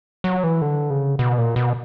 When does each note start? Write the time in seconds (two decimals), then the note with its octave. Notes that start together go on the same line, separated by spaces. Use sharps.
0.24 F#3
0.44 E3
0.62 D3
0.90 C#3
1.19 B2
1.38 A#2
1.56 B2